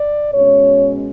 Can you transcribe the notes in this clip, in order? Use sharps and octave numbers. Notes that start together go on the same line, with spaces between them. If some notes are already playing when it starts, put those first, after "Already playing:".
Already playing: D5
B2 G#3 C#4 C#5